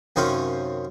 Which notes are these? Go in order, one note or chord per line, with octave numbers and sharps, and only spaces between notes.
F#2 C3 D#3 C4 C#4 F5